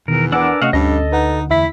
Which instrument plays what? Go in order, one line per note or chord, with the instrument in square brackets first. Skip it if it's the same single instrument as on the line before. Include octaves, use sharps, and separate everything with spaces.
[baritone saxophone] E2 [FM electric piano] B2 D#3 [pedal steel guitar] A#4
[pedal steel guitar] D4 A#4 D6 [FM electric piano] B4 G#5 E6 [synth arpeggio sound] F#5
[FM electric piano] C3 A3 C#4 [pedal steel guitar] F#4 F5 [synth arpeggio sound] D#5 F#5
[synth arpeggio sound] D2 [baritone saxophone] G2 [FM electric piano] C#4 [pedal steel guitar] A4 D#5
[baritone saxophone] D#4 [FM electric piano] B4 F#5
[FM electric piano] E2 E5 B6 [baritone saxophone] E4